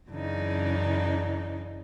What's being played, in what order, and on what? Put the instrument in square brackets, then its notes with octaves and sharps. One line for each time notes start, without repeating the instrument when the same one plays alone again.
[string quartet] F#2 C#3 E3 D4 D#4